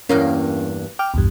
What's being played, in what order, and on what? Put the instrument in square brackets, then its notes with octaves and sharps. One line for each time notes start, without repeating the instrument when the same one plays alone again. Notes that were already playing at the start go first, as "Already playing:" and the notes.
[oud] E2 G2 A#3 [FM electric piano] C#4
[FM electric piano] G5 D6 F6
B1 E2 G2